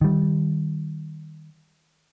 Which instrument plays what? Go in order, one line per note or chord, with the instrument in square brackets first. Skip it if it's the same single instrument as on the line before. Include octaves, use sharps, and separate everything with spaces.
[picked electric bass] D#3 G3